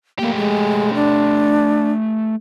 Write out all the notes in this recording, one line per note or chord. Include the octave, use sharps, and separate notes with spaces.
A3 A#3 G4
G#3
D4